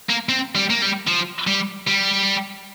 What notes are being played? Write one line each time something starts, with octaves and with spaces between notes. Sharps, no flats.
A#3
C4
G3
A#3
G3
F3
G3
G3